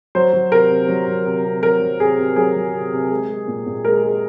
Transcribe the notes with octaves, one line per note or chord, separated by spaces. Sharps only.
F#3 C5
F#3
C3 A#4
C3
F#3
F#3
C3
C3
F#3 A#4
F#3
C3 G#4
C3
F#3 G#4
F#3
C3
C3
G#3
G#3
A#2
A#2
G#3 A#4
G#3